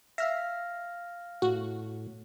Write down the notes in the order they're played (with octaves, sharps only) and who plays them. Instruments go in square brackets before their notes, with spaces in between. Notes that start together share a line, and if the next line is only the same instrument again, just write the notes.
[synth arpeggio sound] E5 [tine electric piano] F5 F6 A#6
[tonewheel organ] A2 [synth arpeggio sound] F#4